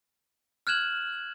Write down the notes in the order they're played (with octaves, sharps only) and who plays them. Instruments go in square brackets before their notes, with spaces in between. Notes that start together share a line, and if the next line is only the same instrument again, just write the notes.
[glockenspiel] F6 F#6 G#6 E7 F#7